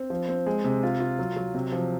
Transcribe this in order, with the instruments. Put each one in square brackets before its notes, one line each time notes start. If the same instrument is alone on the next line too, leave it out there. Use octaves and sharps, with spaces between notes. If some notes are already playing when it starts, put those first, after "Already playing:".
Already playing: [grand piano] C4
F3
C4
G#3
C3
F4
F4
F#3
F#3
C3
F3